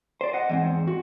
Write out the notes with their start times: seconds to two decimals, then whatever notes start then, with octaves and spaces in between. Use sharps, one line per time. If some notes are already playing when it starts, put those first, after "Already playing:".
0.21 C5 D5
0.33 D#5 F#5
0.49 E2 G#2 C4
0.88 F#4